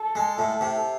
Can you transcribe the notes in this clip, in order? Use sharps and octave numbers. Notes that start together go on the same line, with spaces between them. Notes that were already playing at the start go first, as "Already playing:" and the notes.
Already playing: A4
G#3
A2
C3